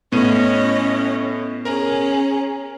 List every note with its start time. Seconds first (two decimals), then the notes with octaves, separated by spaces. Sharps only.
0.12 A2 B3 C#4 C#5 D#5 D#7
1.65 C#4 G#4 A#4 A#5